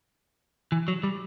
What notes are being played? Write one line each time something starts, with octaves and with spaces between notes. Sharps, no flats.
E3
F#3
G3